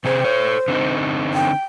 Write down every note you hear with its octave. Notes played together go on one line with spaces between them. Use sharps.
C3 C4 G#4 C5
A4 C#5
D3 C4 D#4
G5